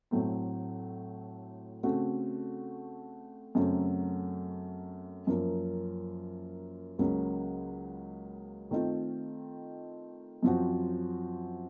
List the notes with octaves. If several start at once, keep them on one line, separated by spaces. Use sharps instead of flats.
A2 F#3 A3 C4
C#3 A3 C4 F#4
F#2 C#3 F#3 A3 C4
F#2 F3 A#3
C#2 C#3 F#3 A#3
D#3 A3 C4 F4
F#2 F3 C4 F#4